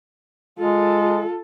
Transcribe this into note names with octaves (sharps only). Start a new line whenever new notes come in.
G#3 F4 A4